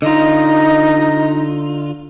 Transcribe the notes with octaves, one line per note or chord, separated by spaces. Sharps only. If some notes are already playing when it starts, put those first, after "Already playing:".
D3 D#4 F4 D#5